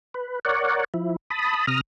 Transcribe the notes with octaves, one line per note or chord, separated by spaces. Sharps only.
B4
A#4 C#5 D5 F#5
F3 E4
A5 B5 D#6
C3 A#5 D#6 F6